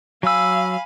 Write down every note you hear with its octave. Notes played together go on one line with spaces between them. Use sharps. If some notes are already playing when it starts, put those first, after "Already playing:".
F#3 F5 G#5 B5 E6